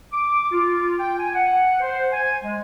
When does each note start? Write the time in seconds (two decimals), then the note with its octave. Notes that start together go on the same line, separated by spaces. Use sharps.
0.13 D6
0.52 F4
1.00 G5
1.19 G#5
1.35 F#5
1.80 C5
2.12 G#5
2.44 G#3